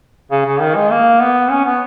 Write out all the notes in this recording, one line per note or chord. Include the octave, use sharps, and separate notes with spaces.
C#3
C#3
D#3
G#3
A#3
B3
C#4
B3